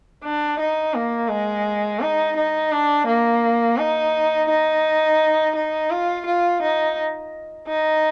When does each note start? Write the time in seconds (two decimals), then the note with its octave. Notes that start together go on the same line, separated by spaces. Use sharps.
0.24 D4
0.60 D#4
0.95 A#3
1.30 G#3
2.01 D#4
2.37 D#4
2.72 D4
3.07 A#3
3.78 D#4
4.49 D#4
5.55 D#4
5.90 F4
6.26 F4
6.62 D#4
7.68 D#4